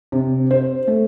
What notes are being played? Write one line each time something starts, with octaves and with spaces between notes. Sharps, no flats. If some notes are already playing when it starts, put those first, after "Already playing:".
C3
C5
A3